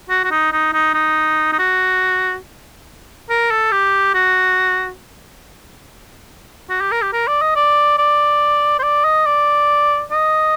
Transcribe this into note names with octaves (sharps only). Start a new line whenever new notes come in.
F#4
F#4
D#4
D#4
D#4
D#4
D#4
F#4
A#4
A4
G4
F#4
F#4
G4
A#4
G4
A#4
D5
D#5
D5
D5
C5
D5
D#5
D5
D#5